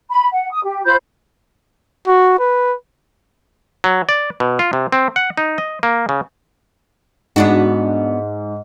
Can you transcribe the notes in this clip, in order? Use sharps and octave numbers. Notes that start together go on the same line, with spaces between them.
B5
F#5
D#6
G4
F4 C5 B5 G6
F#4
B4
F#3
D5
B2
F4
C3
C4
F#5
D#4
D#5
A#3
C#3
G#2 B3 D4 F#4